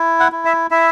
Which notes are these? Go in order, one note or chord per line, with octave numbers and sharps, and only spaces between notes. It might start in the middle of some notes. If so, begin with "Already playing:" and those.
Already playing: E4
F#5
E4
E5
E4 E5